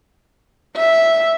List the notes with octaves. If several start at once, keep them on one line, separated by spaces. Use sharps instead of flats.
E5